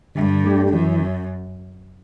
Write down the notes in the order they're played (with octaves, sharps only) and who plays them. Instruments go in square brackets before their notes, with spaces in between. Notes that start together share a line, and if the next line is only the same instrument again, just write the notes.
[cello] G2 [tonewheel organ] D3
[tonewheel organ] A3 D4 G4
[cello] F#2 [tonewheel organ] E3